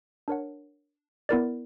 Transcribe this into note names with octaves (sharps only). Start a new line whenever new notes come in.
D4 A#4 C#5 F#5
B3 E4 A#4 D5